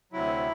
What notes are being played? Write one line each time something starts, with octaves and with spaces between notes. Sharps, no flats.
D2 C3 F#3 E4